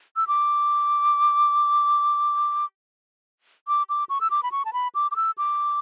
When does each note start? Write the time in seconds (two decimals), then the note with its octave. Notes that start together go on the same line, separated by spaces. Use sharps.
0.16 E6
0.27 D6
3.68 D6
3.89 D6
4.09 C#6
4.21 E6
4.30 D6
4.43 B5
4.52 C#6
4.65 A5
4.73 B5
4.95 D6
5.11 D6
5.16 E6
5.38 D6